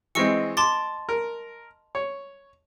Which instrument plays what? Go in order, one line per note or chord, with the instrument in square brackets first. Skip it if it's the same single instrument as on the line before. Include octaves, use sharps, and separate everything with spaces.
[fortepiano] E3 G#3 C4 [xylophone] D#5 C#6 C#7
[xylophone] A5 C6 A6 [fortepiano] D6
[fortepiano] A#4
C#5